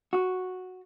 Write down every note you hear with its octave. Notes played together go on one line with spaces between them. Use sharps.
F#4